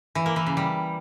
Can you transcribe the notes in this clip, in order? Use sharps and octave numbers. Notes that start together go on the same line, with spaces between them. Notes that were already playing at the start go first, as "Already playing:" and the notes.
E3
A#3
E3
C#3
G3